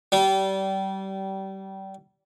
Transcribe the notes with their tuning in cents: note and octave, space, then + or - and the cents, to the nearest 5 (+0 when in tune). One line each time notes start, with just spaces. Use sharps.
G3 -25